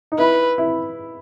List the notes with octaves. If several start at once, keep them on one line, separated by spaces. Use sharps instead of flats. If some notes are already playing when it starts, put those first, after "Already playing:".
D#4
E4 B4
E4